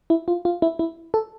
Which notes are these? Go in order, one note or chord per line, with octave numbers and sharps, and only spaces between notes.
E4
F4
F4
E4
E4
A4